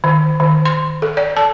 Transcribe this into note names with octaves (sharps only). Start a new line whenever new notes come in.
D#3
D#3
C6
A4
D5
A5